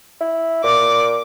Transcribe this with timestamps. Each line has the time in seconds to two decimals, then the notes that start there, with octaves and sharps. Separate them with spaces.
0.21 E4
0.64 A#2 D6